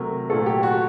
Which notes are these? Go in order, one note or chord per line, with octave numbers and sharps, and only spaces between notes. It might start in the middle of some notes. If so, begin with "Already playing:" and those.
Already playing: C3 F#3 A3 A#4
A#2 F#3 A3 A4
G4
F#4